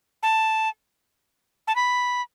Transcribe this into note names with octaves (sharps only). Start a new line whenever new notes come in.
A5
A5
B5